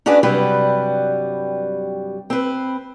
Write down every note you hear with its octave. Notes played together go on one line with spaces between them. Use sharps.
C#4 D4 F#4 G#4 B4 D5
G2 C3 F#3 G3 B4
C4 B4